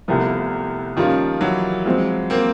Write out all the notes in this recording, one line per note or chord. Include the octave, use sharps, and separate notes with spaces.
C2 C3 F3 A3 B3
A#2 D#3 F3 G3 A#3 C#4 F4
E3 F#3
F3 G#3 C4
A#3 C4